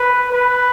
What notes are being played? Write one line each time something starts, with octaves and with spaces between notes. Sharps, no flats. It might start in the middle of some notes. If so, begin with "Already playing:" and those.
Already playing: B4
B4